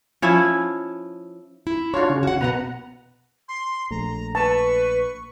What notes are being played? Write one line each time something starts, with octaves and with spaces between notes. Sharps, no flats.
F3 C#4 E4
E4
D4 F4 F#4 C#5 F5
C#3 C#4
F#4 F#5
B2 B3 B4 F#5 A#5
C6
A#1 A3 A#5
B4 A5 C#6